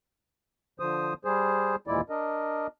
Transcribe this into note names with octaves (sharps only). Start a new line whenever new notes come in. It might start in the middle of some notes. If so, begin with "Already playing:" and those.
D3 F3 C5 D#6
G3 G#4 C5
D#2 A#2 E3 G#3 E4 D5
D4 A#4 D#5